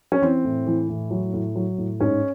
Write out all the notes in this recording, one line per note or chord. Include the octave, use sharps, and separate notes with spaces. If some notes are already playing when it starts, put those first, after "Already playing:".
C#4
E3 C4
A2
E3
A2
F#3
A2
F#3
A2
G#2 C#4